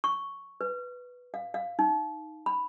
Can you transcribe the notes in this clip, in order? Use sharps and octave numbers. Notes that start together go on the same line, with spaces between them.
C#6
B4
F5
F5
D#4
B5